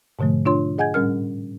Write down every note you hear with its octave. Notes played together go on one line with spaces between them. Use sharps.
G#2 B2 D3 F3 A3
D4 F4 C#5 C6
G#4 D#5 F#5 G#5 G6 G#6
A2 G3 C#4 A#4 F6